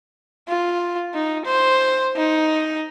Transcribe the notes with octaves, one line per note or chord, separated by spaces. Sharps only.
F4
D#4
C5
D#4